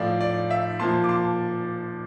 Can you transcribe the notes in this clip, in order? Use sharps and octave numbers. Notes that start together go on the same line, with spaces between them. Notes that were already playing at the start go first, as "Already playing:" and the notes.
Already playing: A2 F3 D5 F5
D5
E5
A#2 F3 A5 C6
D6
A5 C6